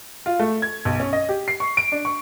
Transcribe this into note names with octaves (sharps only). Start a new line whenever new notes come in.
F4
A3
G#6
B1
C#4
D#5
G4
C7
C#6
D7
D4
C#6